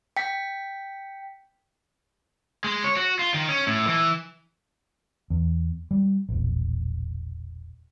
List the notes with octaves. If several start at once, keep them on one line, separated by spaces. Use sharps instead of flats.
G5 B6
G#3
C#5
F#4
F4
D#3
C#4
A2
E3
E2
G3
E1 A#1